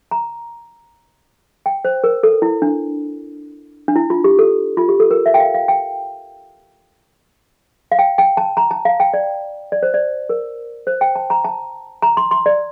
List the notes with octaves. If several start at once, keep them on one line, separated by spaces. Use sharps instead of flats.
A#5
G5
C5
A#4
A4
E4
D4
D4
E4
F4
G4
A4
F4
G4
A4
A#4
E5
G5
F5
F5
G5
F5
G5
G5
A5
A#5
A5
F5
G5
D5
D5
C5
D5
A#4
C5
G5
A5
A#5
A5
A#5
C6
C6
D5